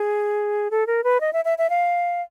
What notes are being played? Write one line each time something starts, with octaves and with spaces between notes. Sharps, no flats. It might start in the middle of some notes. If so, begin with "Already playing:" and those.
Already playing: G#4
A4
A#4
B4
D#5
E5
E5
E5
F5